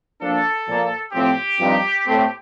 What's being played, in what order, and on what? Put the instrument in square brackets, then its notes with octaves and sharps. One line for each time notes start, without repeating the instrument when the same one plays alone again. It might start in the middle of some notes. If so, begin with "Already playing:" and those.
[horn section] F3 A#3 D4 [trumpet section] A4
[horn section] A#2 F3 A#3
[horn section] A2 F3 C4 [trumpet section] G4
[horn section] G2 F3 C4 D#4
A2 A3 C4